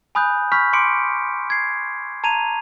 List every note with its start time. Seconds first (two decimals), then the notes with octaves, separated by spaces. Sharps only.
0.15 G#5 B5 D#6 F#6 G6
0.52 B5 C#6 F6 G6 B6
0.73 C6 D6 C#7 D7
1.50 G#6 C7
2.24 A5 A#5 G#6 D#7 F7